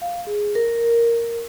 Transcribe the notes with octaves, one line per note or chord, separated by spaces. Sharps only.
F5
G#4
A#4